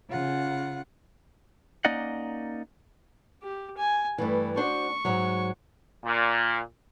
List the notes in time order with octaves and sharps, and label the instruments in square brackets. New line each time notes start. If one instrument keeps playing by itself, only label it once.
[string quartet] C#3 F4 F#5
[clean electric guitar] A#3 C#4 D#4 D5 D#5 F#5
[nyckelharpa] G4
G#5
[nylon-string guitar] G2 E3 [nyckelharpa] A3
[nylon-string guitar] D4 F#4 C5 [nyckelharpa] C#6
[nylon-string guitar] G#2 F#3
[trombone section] A#2